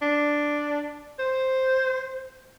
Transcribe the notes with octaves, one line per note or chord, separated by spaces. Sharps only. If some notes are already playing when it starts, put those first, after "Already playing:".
D4
C5